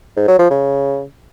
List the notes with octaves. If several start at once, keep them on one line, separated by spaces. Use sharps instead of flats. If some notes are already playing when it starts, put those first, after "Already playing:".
G#2
F#3
F3
C#3